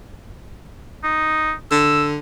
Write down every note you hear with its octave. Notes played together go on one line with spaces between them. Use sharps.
D#4
D3 E6